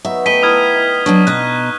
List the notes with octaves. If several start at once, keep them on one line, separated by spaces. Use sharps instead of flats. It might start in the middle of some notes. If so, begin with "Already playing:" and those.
F#3 B3 D#4 E5
A3 B3 D#4 G5 B6 D#7 G7
E4 A#5 D#6 F6 G#6
D#4 B4
F#3 B3 D4 C#6
B2 D#5 A#5 F#6